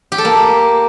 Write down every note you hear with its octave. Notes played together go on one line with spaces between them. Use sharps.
G4
A4
A#3